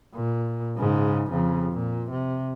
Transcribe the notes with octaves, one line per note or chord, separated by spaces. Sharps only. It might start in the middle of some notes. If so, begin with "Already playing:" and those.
A#2
G#2 C#3
F2 C#3
A#2
C3